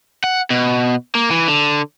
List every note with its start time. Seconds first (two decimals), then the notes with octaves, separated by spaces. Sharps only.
0.24 F#5
0.50 B2
1.15 A#3
1.31 E3
1.48 D3